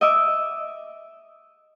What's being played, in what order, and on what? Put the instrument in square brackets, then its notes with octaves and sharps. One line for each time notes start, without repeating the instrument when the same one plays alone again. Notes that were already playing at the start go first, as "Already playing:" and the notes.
[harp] D#5 E5 D6